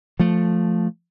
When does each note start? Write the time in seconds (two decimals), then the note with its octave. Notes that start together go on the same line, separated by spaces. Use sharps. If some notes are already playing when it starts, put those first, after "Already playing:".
0.20 F3 A3